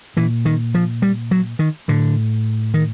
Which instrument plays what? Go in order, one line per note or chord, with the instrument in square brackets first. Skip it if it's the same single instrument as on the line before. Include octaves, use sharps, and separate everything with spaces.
[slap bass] A#2 E3
D#3
F3
G3
F#3
D#3
A2 D3
D#3